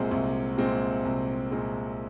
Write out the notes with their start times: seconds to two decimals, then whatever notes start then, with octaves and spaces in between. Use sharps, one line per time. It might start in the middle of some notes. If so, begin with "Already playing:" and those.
Already playing: C2 A#2 G#3 C4
0.11 C2
0.58 A#2 G#3 C4
1.04 C2
1.51 A#2 G#3 C4